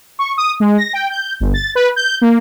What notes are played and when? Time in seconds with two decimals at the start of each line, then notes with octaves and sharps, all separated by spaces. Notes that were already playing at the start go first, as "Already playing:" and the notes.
0.19 C#6
0.38 D#6
0.60 G#3
0.78 A#6
0.93 G5
1.10 G6
1.40 G1
1.54 A6
1.75 B4
1.96 G6
2.21 A#3